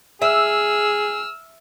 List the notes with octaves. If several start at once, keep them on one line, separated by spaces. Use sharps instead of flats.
G#4 E5 E6 F6